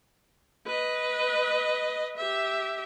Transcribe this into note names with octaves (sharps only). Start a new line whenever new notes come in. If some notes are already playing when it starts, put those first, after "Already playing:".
B4 D#5
G4 E5